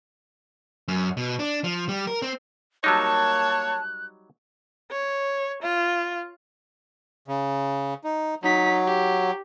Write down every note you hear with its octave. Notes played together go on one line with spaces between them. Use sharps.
F#2
B2
D4
F3
G3
A#4
C4
F#3 G3 A#3 D#4 C#5 A5 F#6
C#5
F4
C#3
D#4
F#3 D#4 B6
G4